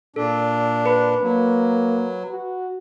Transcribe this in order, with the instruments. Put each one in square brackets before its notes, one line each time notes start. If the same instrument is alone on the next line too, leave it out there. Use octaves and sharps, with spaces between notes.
[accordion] A#2 D4 [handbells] A4
[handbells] B4 B5
[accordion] F#3 [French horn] A#3
[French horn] F#4